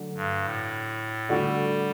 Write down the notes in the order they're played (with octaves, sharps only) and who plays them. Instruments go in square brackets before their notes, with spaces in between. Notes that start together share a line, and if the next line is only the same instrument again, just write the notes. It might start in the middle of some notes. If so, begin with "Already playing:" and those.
Already playing: [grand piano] D3 F#3 A3
[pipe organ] G2
A2
[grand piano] D3 A3 D4 F#4 [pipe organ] G3